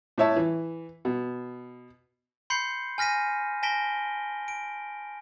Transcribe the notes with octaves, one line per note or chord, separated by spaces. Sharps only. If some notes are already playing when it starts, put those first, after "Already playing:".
A2 E4 C#5 E5 A5
E3
B2
B5 C6 G6 C7 C#7
G#5 F6 A#6 B6 D#7
G#5 A5 A#6 B6 D7 G7
D7